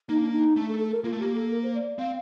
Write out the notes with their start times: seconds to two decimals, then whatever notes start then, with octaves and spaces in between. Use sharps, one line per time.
0.09 A#3 D#4
0.20 D4
0.32 D#4
0.56 A3 D4
0.68 A4
0.80 A4
0.92 A#4
1.04 A#3 F4
1.12 A3
1.19 A#3 G4
1.35 A4
1.51 A#4
1.63 C5
1.75 D5
1.86 D5
1.98 C4 F5